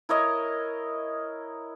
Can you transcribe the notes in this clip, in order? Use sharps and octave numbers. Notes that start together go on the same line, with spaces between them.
E4 A#4 C#5 D#5